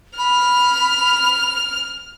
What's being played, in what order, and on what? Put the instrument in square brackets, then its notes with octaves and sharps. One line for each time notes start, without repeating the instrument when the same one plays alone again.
[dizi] B5 [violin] F6